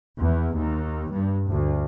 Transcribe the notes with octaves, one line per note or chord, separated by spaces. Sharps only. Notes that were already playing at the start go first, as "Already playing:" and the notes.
E2
D#2
G2
D2